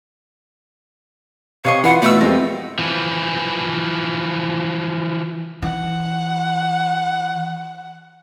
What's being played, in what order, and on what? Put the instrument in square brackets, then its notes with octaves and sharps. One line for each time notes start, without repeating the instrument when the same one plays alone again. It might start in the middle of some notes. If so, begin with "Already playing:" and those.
[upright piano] C3 [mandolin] C#5 D#5 C#6 [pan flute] F5
[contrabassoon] E3 [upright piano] F4 B4 [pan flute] F#5 [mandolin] C6
[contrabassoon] B2 [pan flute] A3 [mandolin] D5 E6
[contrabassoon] F2 [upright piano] G#3 F4 G4 [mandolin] A#4
[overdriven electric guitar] E3 F3
[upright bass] E3 [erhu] F#5